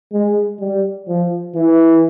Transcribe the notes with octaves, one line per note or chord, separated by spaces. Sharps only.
G#3
G3
F3
E3